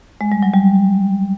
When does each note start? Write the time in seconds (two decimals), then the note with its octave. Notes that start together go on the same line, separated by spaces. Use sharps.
0.21 G#3
0.32 G3
0.43 F#3
0.53 G3